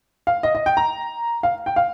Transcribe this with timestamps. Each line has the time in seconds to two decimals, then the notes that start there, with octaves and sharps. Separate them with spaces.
0.27 F5
0.43 D#5
0.55 D#5
0.66 G5
0.77 A#5
1.43 F5
1.66 G5
1.76 F5